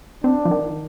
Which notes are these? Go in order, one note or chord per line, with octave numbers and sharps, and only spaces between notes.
C4 D4
F3
D#3